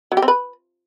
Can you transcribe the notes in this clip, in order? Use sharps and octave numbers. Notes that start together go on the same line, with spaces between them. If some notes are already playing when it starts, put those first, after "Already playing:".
F#3
G4
C4
B4